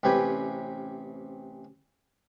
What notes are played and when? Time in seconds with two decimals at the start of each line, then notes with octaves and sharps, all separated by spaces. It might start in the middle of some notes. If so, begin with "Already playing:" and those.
0.03 A1 C3 C#4 G4 B4 G#5